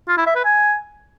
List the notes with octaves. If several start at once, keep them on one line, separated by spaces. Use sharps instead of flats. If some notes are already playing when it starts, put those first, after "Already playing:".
F4
E4
E5
B4
G#5